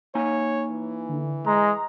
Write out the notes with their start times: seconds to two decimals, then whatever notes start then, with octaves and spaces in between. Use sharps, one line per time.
0.15 A#3 D#4 C#5 G#5
0.71 E3
1.09 D3
1.46 G#3 A#5